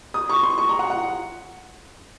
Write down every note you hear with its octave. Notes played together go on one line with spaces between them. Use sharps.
D#6
C#6
C6
C#6
A#5
F#5
F#5